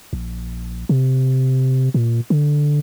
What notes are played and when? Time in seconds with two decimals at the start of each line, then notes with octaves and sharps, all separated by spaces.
0.13 A#1
0.89 C3
1.94 A#2
2.30 D3